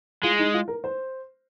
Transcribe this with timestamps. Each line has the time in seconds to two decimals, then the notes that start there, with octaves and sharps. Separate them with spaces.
0.23 G#3 F4
0.39 D#4
0.54 F4
0.68 A#4
0.84 C5